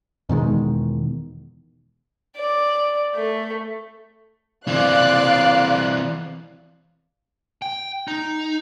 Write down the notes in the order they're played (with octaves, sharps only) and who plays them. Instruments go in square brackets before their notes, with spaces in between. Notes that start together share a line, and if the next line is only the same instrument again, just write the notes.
[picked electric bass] E2 B2 D#3 G#3
[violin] D5
A3
[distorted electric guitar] E3 C4 [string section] D5 F5 F#6
[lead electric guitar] G5
D#4